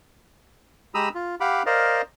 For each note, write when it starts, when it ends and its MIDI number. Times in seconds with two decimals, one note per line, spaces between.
0.94 1.09 56
0.94 1.09 67
0.94 1.09 82
0.94 1.09 83
0.94 1.09 87
0.94 1.09 88
1.15 1.35 65
1.40 1.63 67
1.40 1.63 77
1.40 1.63 78
1.40 1.63 83
1.40 1.63 86
1.66 2.02 70
1.66 2.02 72
1.66 2.02 74
1.66 2.02 75
1.66 2.02 77